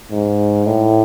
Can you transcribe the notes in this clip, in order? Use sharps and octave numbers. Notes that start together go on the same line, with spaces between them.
G#2
A2